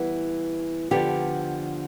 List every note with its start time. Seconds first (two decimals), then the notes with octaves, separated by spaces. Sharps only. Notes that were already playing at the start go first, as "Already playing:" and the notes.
Already playing: E3 G3 B3
0.91 D3 F3 B3 G4